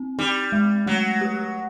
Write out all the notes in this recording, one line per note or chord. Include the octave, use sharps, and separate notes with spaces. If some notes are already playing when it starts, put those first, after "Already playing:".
Already playing: C4
G3 D#4
G#3
F#3 A3
G4